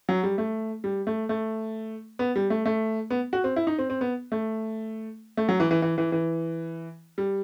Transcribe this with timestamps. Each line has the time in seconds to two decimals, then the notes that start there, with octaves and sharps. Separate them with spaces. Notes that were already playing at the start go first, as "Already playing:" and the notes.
0.09 F#3
0.23 G3
0.38 A3
0.84 G3
1.07 A3
1.29 A3
2.19 B3
2.36 G3
2.50 A3
2.66 A3
3.10 B3
3.33 F#4
3.44 C4
3.56 E4
3.67 D#4
3.78 C4
3.90 C4
4.01 B3
4.32 A3
5.37 A3
5.49 F#3
5.60 E3
5.71 E3
5.82 E3
5.98 E3
6.12 E3
7.18 G3